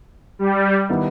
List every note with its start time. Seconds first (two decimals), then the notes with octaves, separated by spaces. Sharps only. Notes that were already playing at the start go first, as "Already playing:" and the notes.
0.39 G3
0.89 D#3 G3 B3 E4